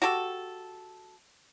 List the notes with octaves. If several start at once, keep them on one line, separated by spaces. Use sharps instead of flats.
F#4 G4 A4